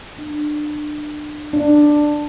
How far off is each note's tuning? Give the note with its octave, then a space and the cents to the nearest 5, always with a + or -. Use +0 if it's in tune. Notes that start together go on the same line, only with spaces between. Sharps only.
D4 +30
D4 +10